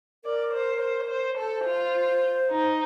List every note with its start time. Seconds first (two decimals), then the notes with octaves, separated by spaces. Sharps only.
0.24 A#4 D5
0.53 C5
0.81 C5
1.10 C5
1.38 A4 C5
1.66 F4
2.50 D#4